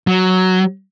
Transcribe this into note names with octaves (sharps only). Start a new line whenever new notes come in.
F#3